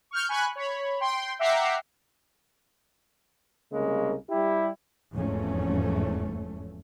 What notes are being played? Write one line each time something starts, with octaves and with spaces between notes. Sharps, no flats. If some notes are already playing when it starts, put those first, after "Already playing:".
C#6 F6 G6
G#5 B5 C#6 F#6
C#5 B5
G5 C6
E5 F#5 G5 A#5 D6 C7
C2 C#3 G#3 A#3
G3 E4 G4
F1 E2 G#2 F3 A3 C#4